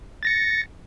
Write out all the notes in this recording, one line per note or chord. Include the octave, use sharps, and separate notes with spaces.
A6 A#6 C#7